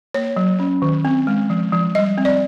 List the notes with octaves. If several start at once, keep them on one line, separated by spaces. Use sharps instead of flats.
A#3 C#5
F#3
C#4
D#3
C4
G#3
F3
F3
G3 D#5
C4
D5